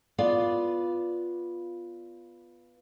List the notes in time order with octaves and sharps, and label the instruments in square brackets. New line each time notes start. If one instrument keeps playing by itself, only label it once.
[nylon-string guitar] B3 F4 D5